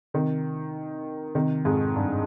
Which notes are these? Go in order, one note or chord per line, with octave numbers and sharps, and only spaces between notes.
C3 D#3
C3 D#3
F2 G#2
G2